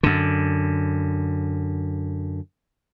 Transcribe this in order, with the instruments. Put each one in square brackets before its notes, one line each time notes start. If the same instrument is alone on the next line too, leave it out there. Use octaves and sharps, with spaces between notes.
[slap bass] F#2 D3